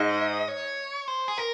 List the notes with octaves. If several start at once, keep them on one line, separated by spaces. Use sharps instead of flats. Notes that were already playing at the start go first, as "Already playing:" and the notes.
Already playing: G#2 D#5
C#5
C5
G#4
A#4